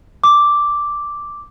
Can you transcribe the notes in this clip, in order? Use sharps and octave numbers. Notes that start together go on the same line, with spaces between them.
D6